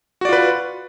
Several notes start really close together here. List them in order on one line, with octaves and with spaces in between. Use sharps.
F#4 D5 F4 B4